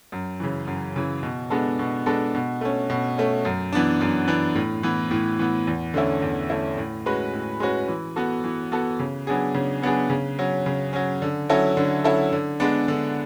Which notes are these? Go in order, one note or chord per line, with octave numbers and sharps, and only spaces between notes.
F#2
C#3 E3
F#2
C#3 E3
B2
G#3 B3 D4 A4
B2
G#3 B3 D4 A4
B2
A3 C#4
B2
A3 C#4
F#2
E3 B3 D4
F#2
E3 B3 D4
A2
E3 B3
A2
E3 B3
E2
D3 A3 C#4 E4
E2
D3 A3 C#4 E4
A2
G#3 C#4 F#4 B4
A2
G#3 C#4 F#4 B4
E3
B3 F#4 A4
E3
B3 F#4 A4
C#3
F#3 B3 D4 G#4
C#3
F#3 B3 D4 G#4
C#3
F#3 C#4
C#3
F#3 C#4
D3
F#3 C#4 E4 A4
D3
F#3 C#4 E4 A4
D3
G#3 B3 D4
D3